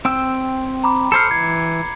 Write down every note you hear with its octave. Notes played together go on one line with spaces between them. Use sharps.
C4 G5 E6
A#5 B5 D6
A4 C5 F6 C7 C#7
E3 G#6